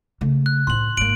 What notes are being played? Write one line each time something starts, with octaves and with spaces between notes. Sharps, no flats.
C#3 A3
F#6
A2 C4 C6 F#7
G#1 A#3 D7 F#7